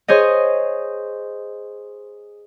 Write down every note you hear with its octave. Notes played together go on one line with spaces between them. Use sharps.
G#4 C5 C#5 D#5